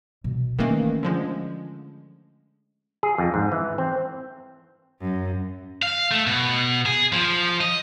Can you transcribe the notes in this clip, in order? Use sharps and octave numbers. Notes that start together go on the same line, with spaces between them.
B2
D#3 E3 A3 A#3 C#4
D3 F3 G#3
G#4
F2
G#2
E3
C4
F#2
F5
A3
B2
G#4
F3
D#5